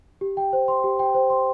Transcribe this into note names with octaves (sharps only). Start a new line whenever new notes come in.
G4
G5
C5
C6
G4
G5
C5
C6